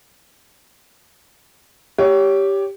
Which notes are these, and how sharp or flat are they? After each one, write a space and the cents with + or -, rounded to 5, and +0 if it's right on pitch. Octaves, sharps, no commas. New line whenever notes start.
G4 +0 C#5 +20